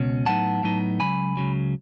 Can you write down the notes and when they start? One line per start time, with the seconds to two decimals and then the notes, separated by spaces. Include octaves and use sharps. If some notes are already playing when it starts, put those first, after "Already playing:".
Already playing: C#2 B2 C#4
0.26 A2 F#3 B3 D#4 F#5 A5
0.63 A2 F#3 B3 D#4
1.00 C#2 C#3 F#3 G#5 B5
1.37 C#2 C#3 F#3